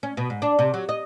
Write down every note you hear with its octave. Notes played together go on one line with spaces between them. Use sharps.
C#4
B2
G#2
D4
C3
F#3
D#5